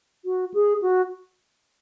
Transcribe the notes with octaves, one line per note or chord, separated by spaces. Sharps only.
F#4
G#4
F#4